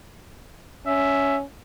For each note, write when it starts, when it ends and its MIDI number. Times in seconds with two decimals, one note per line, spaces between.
0.87 1.43 61
0.87 1.36 76